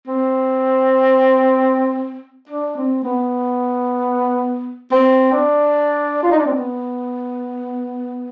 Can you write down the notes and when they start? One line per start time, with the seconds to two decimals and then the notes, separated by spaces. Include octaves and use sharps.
0.07 C4
2.49 D4
2.76 C4
3.04 B3
4.91 C4
5.32 D4
6.23 F4
6.31 D#4
6.38 D4
6.46 C4
6.53 B3